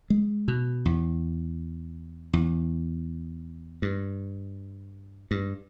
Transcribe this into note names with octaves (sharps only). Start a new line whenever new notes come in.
G#3
B2
E2
E2
G2
G2